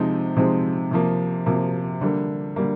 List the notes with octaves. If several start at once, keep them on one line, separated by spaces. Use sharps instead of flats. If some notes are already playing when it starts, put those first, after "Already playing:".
Already playing: C3 F3 G#3 C4 D#4
C3 F3 G#3 C4 D#4
C3 F3 A#3
C3 F3 A#3
D3 G3 A#3
D3 G3 A#3